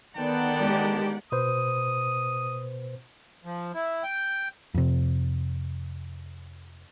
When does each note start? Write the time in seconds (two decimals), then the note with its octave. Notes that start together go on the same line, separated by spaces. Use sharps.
0.17 D3 D#3 B3 A#4 D5 F#5 G5 A5
0.60 G#3 G4
1.32 B2 B4 C5 D#6
3.45 F3
3.75 E4
4.03 G5
4.74 F2 C3